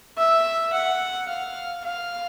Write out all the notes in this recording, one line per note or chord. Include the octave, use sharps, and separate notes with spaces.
E5
F#5
F5
F5